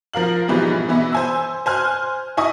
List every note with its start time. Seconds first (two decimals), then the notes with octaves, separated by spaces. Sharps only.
0.13 F3 A#4 F5 F#7
0.48 G#2 B2 E3 F3 G3
0.88 B2 E3 B3 E4
1.12 C5 G#5 E6
1.66 C5 G#5 F6 F#6
2.37 D#4 E4 D#5 G#5 C#6 D#6